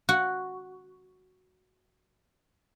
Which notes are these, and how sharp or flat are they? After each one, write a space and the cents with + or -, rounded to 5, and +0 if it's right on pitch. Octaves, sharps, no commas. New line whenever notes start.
F#4 +0 F#5 +0